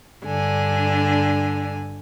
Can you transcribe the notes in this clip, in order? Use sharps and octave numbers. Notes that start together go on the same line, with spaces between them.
G2 D3 D4 G#5